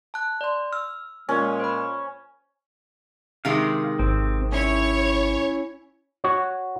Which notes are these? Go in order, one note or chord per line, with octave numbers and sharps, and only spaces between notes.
A5 F#6
D5 C6
E6 F6
A#2 G#3 C#4
C5 B5
C3 D#3 G#3 F5
G#1 C4
C#4 E4 C#5
F#4 C#5